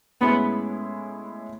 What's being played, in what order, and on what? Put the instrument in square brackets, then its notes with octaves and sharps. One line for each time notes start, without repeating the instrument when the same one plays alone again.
[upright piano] A2 G#3 C#4 E4 [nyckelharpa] B3